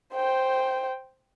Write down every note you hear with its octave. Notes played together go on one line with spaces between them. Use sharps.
C5 G5